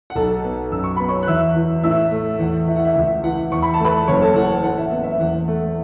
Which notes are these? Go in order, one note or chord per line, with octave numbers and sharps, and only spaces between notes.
F#5
B1 A4 A5
B3
F#2 E6
C#6
B3 B5
C#5 C#6
F#6
E2 E5 E6
E3
A2 E5 E6
A3
E2 F#5
E3 E5
F#5
E5
C#2 E5
E3 F#5
E2 C#6
B5
A5
A3 B4 B5
F#1 C#5 C#6
A4 A5
E3 F#5
F#5
A2 F#5
E5
B3
E5
E2 F#5
A3